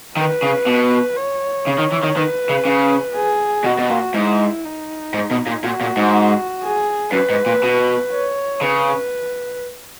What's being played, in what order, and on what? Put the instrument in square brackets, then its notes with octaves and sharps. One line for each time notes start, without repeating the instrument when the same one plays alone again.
[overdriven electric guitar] D#3 [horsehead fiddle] B4
[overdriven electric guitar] C#3
B2
[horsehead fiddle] C#5
[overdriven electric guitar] C#3
D#3
E3
D#3
[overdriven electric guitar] D#3 [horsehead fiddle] B4
[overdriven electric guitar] C#3
C#3
[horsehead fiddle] G#4
[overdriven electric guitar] B2 [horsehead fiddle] F#4
[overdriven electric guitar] B2
A#2
[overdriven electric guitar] G#2 [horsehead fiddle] E4
[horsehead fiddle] D#4
[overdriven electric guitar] G#2
B2
A#2
[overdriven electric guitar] A#2 [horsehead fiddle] F#4
[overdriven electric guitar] A#2
G#2
[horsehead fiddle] G#4
[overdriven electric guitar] F#2 [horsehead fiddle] B4
[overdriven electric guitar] G#2
A#2
B2
[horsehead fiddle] C#5
[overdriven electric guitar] C#3 [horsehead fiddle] B4